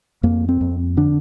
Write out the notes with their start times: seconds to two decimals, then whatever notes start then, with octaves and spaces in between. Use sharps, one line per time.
0.23 F2 A#3
0.49 C4
0.61 F2
0.97 D3 D4